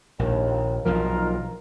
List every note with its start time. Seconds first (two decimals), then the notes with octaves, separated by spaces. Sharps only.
0.19 A#1 D#2
0.85 B1 B2 F3 D#4 F4 A#4